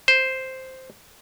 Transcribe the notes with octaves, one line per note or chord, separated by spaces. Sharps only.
C5